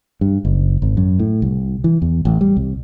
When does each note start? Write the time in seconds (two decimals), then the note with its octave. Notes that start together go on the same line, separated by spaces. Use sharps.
0.21 G2
0.45 F#1
0.82 G#1
0.97 F#2
1.19 A2
1.42 C2
1.84 E3
2.02 E2
2.25 A1
2.41 G3
2.57 C2